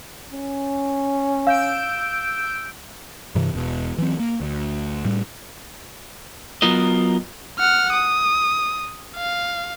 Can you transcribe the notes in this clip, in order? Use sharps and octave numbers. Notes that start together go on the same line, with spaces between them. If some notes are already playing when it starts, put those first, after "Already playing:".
C#4
F5 E6 G6 D7
G2 C3 E3
E1 B2
E3 F#3 C4
A#3
D2
A2 G3
F#3 B3 F4 A#4 D#5
F#5 F6
D#6
F5